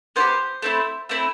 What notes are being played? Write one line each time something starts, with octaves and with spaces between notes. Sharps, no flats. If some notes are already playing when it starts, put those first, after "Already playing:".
B3 D#4 G4 C5
A3 C4 E4
A3 C4 E4